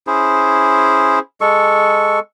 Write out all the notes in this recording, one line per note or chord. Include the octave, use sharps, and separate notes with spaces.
C#4 E4 G#4 C5
G#3 A4 C#6